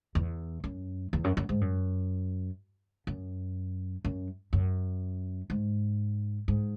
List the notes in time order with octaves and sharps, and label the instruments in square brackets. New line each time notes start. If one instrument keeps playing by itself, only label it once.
[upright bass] E2
F#2
E2
F#2
F#2
G#2
F#2
F#2
F#2
F#2
G#2
G#2